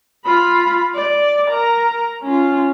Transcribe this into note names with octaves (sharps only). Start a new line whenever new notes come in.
F4 B5
D5
A#4 A#5
C#4 F4